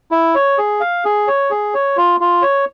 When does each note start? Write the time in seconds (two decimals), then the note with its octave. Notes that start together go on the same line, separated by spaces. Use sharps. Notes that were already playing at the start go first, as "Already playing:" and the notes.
0.11 E4
0.35 C#5
0.58 G#4
0.81 F5
1.05 G#4
1.27 C#5
1.50 G#4
1.74 C#5
1.97 F4
2.20 F4
2.42 C#5